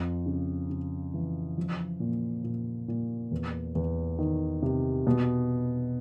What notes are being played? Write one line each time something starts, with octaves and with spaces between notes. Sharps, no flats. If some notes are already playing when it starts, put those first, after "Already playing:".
Already playing: F2
C#3
C#3
E3
F3
A#2
A#2
A#2
E2
E2
D#3
C3
B2